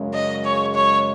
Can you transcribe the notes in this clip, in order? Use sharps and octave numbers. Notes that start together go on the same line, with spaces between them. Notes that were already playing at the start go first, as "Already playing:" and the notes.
Already playing: F#2 C#3 G#3
D#5
C#5
C#5